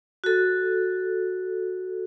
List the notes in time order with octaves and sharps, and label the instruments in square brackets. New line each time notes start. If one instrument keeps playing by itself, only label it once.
[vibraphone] F#4 A4